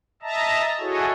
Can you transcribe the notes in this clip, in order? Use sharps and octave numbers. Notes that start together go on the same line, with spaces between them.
D#5 E5 A5 A#5
E4 F#4 G#4 A4 C#5 D#5